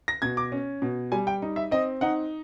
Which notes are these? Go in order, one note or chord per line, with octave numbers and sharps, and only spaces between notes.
A#6
B2 G#6
D6
C#4
B2
G3 G#5
G5
D#4
E5
C4 D#5
D#4 F#5